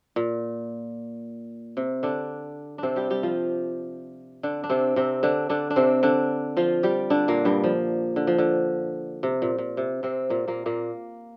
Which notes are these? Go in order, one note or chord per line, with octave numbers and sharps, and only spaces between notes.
A#2
C3
D3 D4
C3 C4 D4
G3 G4
G3 G4
F3 F4
D3 D4
D4
C3 C4
C3 C4
D3 D4
D3 D4
D4
C3 C4
D3 D4
F3 F4
G3 G4
D3 D4
A#2 A#3
G2 G3
F3
D3
F3
D3
C3
A#2
A#2
C3
C3 C4
A#2 A#3
A#2 A#3
A#2 A#3